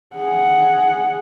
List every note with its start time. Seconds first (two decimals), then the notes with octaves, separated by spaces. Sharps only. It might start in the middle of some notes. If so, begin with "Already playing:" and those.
0.16 G#4 F#5